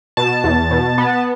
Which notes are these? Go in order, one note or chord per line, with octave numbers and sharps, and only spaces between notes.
B2 A5
E2
B2
B3